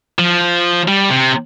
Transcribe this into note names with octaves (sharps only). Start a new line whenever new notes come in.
F3
G3
C3